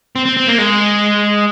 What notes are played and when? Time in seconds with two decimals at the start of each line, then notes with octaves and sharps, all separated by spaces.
0.16 C4
0.26 C4
0.37 C4
0.47 A#3
0.58 G#3